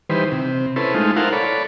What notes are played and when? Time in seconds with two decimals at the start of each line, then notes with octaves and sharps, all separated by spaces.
0.10 D#3 E3 G3 B4 C5
0.32 C3
0.76 C#4 E4 A4 B4 C5
0.94 G#3 A3 D#4 F4
1.16 E4 A4 A#4 C5 F5 F#5
1.33 A4 C#5 D5 B5